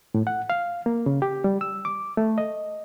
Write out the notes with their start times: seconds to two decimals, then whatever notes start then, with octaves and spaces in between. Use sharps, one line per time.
0.14 A2
0.27 F#5
0.50 F5
0.86 A#3
1.06 C#3
1.22 G4
1.44 G3
1.61 E6
1.85 D6
2.17 A3
2.38 D#5